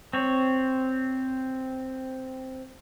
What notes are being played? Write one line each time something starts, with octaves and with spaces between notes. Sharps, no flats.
C4 C#5